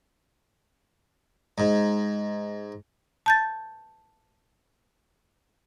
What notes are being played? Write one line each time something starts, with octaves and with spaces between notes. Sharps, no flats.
G#2
A5 G6 A6